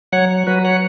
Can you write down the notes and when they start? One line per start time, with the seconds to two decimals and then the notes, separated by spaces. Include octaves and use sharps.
0.12 F#3 C#5 F#5
0.47 F#3 F#4 B4
0.64 C#5 F#5